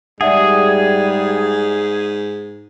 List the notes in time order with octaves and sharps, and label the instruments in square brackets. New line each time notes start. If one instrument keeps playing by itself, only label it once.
[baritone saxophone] G#2 [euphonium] G3 [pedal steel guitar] G#4 [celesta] D5 E5 F#5